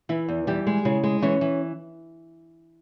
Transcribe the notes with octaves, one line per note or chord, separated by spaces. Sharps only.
E3 E4
E2
E3 G3 G4
G#3
C#3 E4
G#3
E3 C#4 C#5
E3